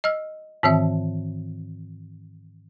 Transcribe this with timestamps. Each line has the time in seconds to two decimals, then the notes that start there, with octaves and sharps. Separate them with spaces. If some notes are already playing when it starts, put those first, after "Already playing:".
0.04 D#5 E6 F6
0.63 G#2 D#3 E3 C4 E5